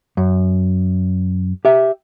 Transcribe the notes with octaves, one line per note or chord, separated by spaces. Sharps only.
F#2
G4 E5